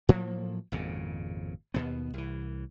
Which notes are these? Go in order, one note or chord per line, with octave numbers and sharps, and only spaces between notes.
A2 F3 F#3 A#3
G#1 F2 A#2 C#3
D#2 B2 B3
C2 E3